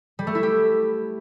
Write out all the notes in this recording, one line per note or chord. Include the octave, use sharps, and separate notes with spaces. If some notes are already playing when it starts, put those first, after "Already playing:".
G3
A3
E4
G4